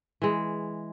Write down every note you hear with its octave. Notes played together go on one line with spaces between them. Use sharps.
E3 G#3